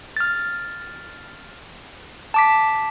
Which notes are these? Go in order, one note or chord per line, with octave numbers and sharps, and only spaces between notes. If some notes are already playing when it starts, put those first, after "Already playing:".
F6 A6
A5 D6 B6